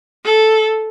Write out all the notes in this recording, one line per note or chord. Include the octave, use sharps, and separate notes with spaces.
A4